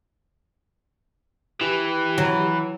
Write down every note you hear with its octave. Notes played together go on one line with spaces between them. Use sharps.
E3 G4
F#3